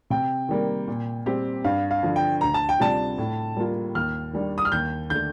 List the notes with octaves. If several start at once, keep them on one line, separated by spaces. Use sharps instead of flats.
C3 G5
D#3 G3 A#3
A#2
G3 C4 G4
G2 F5
F5
D3 F3
G5
D2 A#5
A5
G5
C3 G3 D4 F4 A5
A2
G3 A#3 F4
D#2 F6
D#3 G3 D4
D#6
F6
D#2 G6
D3 A3 G6